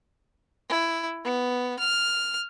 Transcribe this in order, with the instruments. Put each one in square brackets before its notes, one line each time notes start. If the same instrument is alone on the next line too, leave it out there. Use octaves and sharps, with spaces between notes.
[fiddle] E4
B3
F6